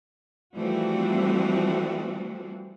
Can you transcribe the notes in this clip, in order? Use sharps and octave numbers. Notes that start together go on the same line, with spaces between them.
E3 F3 G3 A3 C4 F#4